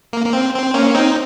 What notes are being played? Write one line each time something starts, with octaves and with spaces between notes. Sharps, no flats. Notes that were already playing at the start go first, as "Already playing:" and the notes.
A#3
A#3
C4
C4
A#3 C#4
C4 D#4